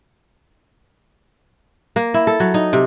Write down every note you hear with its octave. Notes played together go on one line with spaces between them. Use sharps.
A#3
E4
A4
F#3
D#4
C3